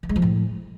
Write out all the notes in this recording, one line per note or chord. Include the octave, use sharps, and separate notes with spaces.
E3
G#3
F3
A2